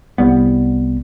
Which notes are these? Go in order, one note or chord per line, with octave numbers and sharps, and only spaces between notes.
C2 G3 B3